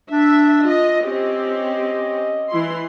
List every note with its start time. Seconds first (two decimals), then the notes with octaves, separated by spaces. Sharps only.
0.10 D4 E5
0.61 F4 D#5
1.05 C4 C#4 G4 D#5
2.50 E3 E4 C6